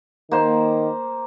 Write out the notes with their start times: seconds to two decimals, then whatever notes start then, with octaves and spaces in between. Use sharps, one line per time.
0.31 D#3 A#3 C5